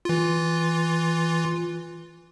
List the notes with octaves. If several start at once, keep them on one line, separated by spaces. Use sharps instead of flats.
E3 F4